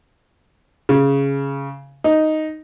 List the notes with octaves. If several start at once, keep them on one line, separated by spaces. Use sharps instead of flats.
C#3
D#4